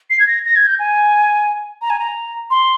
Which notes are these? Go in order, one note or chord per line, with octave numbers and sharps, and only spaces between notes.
C7
G#6
A#6
A#6
G#6
G6
G#5
A#5
G#5
A#5
C6